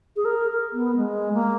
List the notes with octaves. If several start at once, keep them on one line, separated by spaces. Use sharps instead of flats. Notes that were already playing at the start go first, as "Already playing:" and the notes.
G#4
A#4
B3
G#3
A#3